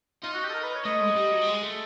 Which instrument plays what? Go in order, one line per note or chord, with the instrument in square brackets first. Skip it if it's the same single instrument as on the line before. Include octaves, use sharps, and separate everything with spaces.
[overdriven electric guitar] D#4 [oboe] F4
[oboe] F#4
G4
A4
A#4
B4
C#5
[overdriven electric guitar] A3 [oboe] D#5
[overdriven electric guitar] G#3
F#3
G3
F#3
G3
G#3
A3